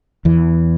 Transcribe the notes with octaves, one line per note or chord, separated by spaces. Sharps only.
E2 E3